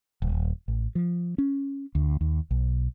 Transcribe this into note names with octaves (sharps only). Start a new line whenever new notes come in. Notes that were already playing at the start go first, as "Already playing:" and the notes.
D#1
A1
F3
C#4
D2
D#2
B1